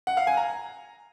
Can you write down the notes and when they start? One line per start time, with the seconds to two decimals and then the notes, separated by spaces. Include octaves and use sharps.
0.07 F#5
0.17 F5
0.27 G#5
0.37 A#5